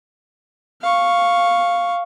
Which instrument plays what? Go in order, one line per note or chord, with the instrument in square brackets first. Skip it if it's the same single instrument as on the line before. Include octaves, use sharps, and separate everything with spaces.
[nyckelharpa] F5 C#6